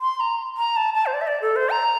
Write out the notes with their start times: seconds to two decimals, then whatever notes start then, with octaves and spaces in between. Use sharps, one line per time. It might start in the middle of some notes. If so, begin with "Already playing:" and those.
0.01 C6
0.20 A#5
0.57 A#5
0.76 A5
0.94 A5
1.06 C5
1.14 D5
1.21 E5
1.27 D5
1.42 A4
1.56 C5
1.70 A#5